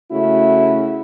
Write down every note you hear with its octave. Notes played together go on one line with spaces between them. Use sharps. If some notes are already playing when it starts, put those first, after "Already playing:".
C#3 A3 E4 F#4